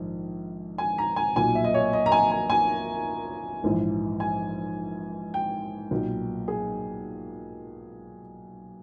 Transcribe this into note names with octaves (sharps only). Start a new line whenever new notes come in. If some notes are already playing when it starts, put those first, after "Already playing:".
Already playing: A#1 G#2 D#3
G#5
A#5
G#5
B1 A#2 G#5
E5
D#5
C#5
D#5
A#5
G#5
G#5
G#5
A#1 G#2 E3
G#5
G5
B1 A#2
G#4